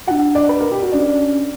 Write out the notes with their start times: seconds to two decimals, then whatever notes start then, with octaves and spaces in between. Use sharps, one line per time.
0.07 D4 F#4 F#5
0.35 D5
0.49 B4
0.60 A#4
0.71 G4
0.82 F#4
0.92 C#4 D4